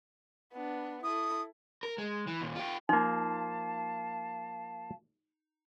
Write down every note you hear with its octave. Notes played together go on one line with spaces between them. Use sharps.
B3 D4
E4 A4 D#6
A#4
G#3
E3
D#2 A#2
F4 G4
F3 A#3 D#4 F5 A5